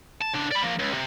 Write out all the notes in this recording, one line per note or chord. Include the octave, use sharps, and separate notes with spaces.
A5
C#3 D4
D5 B5
F3 A#3
C#2
C3